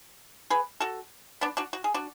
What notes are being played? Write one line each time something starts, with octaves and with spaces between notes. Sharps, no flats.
G#4 B4
F#4 A4
B3 D4
D4 F#4
F#4
G#4
D4 F#4